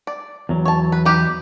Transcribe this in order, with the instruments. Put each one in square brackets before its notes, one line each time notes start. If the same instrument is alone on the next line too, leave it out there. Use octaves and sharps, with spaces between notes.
[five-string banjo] D5
[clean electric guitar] E2 F#3
[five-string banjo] C#5 A5
B4
D#4 G4 B4